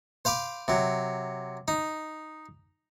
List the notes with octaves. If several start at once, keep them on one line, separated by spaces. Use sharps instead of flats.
C5 F5 B5 D6
C3 F#3
D#4